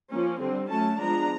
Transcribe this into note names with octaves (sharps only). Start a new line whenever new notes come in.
F3 A#3 C#4
D3 G3 C4
F#3 A3 C#4 A5
F3 G#3 B3 D4 A#5